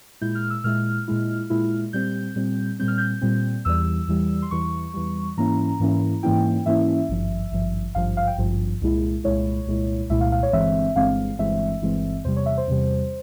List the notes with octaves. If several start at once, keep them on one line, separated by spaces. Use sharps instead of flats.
A#2 G#3 E4 G6
F6
E6
A#2 G#3 E4 F6
A#2 G#3 E4
A#2 G#3 E4
A#2 G3 C4 G6
A#2 G3 C4
A#2 G3 C4 G6
F6
G6
A#2 G3 C4
E2 E3 G3 E6
E2 E3 G3
C6
E2 E3 G3 C#6
E2 E3 G3
G#2 E3 A#3 C#4 E4 A#5
G#2 E3 A#3 C#4 E4
G#2 E3 A#3 C#4 E4 G5
G#2 E3 A#3 C#4 E4 E5
G#1 G2 F3
G#1 G2 F3
G#1 G2 F3 F5
F5
G5
G#1 G2 F3
C2 A#2 G#3 E4
C2 A#2 G#3 E4 C#5
C2 A#2 G#3 E4
C2 A#2 G#3 E4 E5
F5
F5
C#5
G1 G2 E3 G#3 C4 E5
G1 G2 E3 G#3 C4 F5
G1 G2 E3 G#3 C4 E5
G1 G2 E3 G#3 C4
E2 C3 G3 C5
C#5
E5
C5
E2 C3 G3